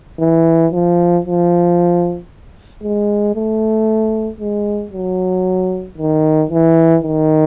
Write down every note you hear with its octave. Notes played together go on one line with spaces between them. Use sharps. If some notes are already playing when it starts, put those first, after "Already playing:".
E3
F3
F3
G#3
A3
G#3
F#3
D#3
E3
D#3